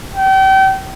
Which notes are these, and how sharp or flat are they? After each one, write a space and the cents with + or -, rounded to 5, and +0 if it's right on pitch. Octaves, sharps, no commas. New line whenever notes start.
G5 -35